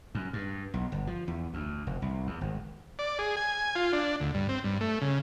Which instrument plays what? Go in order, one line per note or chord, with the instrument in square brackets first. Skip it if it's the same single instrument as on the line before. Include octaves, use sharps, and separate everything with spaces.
[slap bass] F#2
G2
B1
G1
F3
E2
D2
F1
C2
E2
G#1
[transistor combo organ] D5
G#4
G#5
F4
D4
D2
G2
C4
G2
A3
C#3